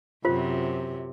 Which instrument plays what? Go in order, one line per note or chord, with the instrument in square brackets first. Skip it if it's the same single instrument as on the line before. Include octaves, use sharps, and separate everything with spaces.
[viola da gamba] F#2 C3 [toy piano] F4 C5